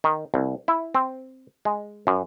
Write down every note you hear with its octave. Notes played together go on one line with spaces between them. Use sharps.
D#3
C2
E4
C4
G#3
F#2